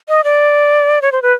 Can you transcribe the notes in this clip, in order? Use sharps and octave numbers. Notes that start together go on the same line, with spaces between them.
D#5
D5
C#5
C5
B4